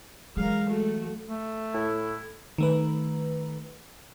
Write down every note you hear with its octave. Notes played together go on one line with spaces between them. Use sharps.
E3 F#3 G#3 A#4 F5
A3 F#4
A3
A2 E4
D#3 A3 B4